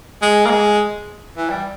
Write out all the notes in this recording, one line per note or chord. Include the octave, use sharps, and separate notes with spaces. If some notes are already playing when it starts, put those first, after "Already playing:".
G#3
A#3
G#3
E3
G3